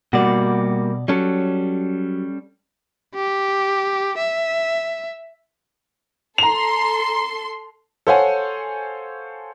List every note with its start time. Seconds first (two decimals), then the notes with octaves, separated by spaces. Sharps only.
0.13 B2 G3 A#3 F#4 D5
1.08 F#3 G3 C#4 A4
3.15 G4
4.18 E5
6.38 A4 A#5 C6 F7
8.07 A4 C5 C#5 F5 F#5 G#5